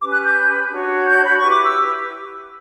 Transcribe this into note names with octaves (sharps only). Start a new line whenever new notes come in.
C#4 G4 B4 D6
F#6
G6
D4 F#4 C#5
G6
B5
C#6
E4 G4 B4
D6
E6